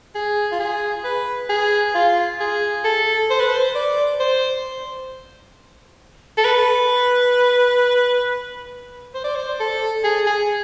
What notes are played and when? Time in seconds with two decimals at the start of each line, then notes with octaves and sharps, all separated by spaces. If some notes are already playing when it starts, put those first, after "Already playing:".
0.15 G#4
0.52 F4
0.60 G#4
1.04 B4
1.50 G#4
1.95 F4
2.40 G#4
2.84 A4
3.30 C5
3.40 B4
3.50 C5
3.75 D5
4.20 C5
6.38 A4
6.45 B4
9.14 C5
9.24 D5
9.35 C5
9.60 A4
10.04 G#4
10.27 G#4